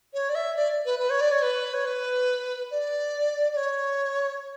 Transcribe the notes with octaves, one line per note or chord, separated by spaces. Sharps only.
C#5
D5
E5
D5
B4
B4
C#5
D5
C#5
B4
C#5
B4
D5
D5
C#5